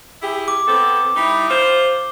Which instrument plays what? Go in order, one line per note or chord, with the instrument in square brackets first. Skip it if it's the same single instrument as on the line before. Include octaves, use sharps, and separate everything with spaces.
[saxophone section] E4 G4 G#4
[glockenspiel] D6
[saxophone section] B3 C4 A4
G3 D#4 E4
F4 C5